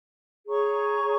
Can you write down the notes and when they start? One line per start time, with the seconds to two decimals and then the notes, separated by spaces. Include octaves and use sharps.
0.48 G#4 C#5 A#5 C#6